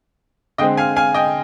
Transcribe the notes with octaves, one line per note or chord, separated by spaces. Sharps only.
D3 G#3 C4 D#5 G5
F5 G#5
F5 G#5
D#5 G5